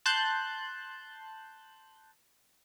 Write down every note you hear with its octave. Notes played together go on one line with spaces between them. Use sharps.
A5 C6 F#6 G6